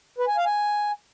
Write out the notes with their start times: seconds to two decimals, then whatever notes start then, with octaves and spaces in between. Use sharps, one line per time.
0.18 B4
0.28 G#5
0.37 F5
0.46 G#5